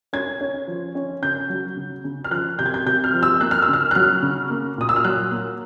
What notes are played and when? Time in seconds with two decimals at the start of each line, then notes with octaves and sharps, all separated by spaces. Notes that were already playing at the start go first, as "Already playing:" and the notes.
0.13 C#4 G#6
0.41 C#4
0.68 F3
0.95 C#4
1.22 C#3 G6
1.50 F#3
1.76 C#3
2.04 C#3
2.24 F6
2.31 F3 F#6
2.59 C3 G6
2.66 G#6
2.74 G6
2.86 C3 G6
3.04 F6
3.14 F3
3.23 E6
3.41 A#3 F#6
3.51 F6
3.62 E6
3.68 C#3
3.73 F6
3.91 F#6
3.95 F#3 F6
4.22 C#3
4.50 A#3
4.78 A#2 D#6
4.89 E6
4.96 F6
5.04 F#3 F#6
5.31 A#3